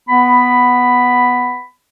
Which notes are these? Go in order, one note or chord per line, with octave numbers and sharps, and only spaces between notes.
B3 B5